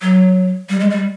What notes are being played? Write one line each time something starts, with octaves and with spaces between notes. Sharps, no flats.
F#3
G3
G#3
G3